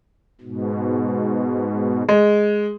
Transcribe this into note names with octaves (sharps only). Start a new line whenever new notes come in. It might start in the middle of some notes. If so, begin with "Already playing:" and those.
G#2 B2
G#3